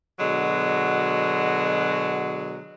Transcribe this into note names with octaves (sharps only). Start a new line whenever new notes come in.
B2 D3 F#3 G#3